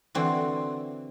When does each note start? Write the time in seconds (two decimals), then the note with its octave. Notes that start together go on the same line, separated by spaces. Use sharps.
0.15 D3 E3 C4 F#4 A4